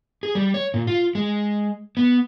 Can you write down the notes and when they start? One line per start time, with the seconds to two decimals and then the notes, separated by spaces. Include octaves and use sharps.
0.23 G#4
0.35 G3
0.54 C#5
0.74 A#2
0.87 F4
1.15 G#3
1.97 B3